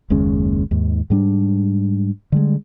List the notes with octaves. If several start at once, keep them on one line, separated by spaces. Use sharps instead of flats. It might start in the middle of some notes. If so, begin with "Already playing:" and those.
F#1 D#2 G#3 C#4
D#2 G#2
G#2 G3 D4
D3 G3 G#3